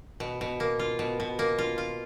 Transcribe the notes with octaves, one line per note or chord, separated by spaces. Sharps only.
B2
B2
A#3
F4
B2
B2
A#3
F4
F4